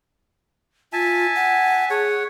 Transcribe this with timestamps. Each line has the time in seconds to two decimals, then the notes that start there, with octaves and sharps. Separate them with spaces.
0.93 F4 E5 G#5 A5
1.35 F#5
1.90 G#4 C#5 F#5